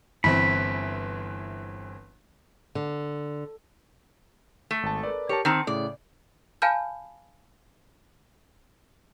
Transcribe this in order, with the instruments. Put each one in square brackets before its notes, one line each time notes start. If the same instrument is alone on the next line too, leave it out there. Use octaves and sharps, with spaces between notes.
[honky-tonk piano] G1 E3 C4 [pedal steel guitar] B5
[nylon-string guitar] D3
[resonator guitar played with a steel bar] A3
[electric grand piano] G#1 A5
A#4 B4 D5
[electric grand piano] G4 A#4 A5 [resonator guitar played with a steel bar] C#5
[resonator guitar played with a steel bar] D#3 C4 [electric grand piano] A5
[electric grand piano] A2 C#3 [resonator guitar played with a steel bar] D5
[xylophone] F5 G#5 A5 B5 F6 G6